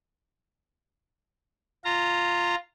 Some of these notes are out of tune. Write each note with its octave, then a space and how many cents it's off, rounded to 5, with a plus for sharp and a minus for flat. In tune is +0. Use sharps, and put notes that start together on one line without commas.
F4 +0 A#5 -20